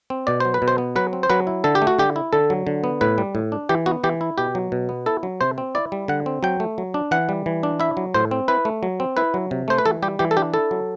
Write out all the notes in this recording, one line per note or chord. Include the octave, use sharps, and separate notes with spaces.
C4
B2 D5
F#3 C5
B4
B2
C5
B3
F#3 B4
C4
C5
F#3 B4
E4
D3 A4
G4
A3
F#4
D3 G4
E4
D3 A4
F#3
D3
B3
A2 B4
G3
A2
D4
E3 G4
B3 F#4
E3 G4
E4
B2 G4
F#3
B2
B3
E4 A4
F#3
C3 C5
C4
E4 D5
G3
D3 F#5
C4
F#3 G5
A3
F#3
D4
E3 F#5
G3
E3
D4
E4 E5
F#3
A2 C5
C4
E4 B4
A3
F#3
C4
E4 B4
F#3
C3
A3 C5
B4
E3 A4
G3 G4
E3 G4
A4
D4 G4
E4 A4
F#3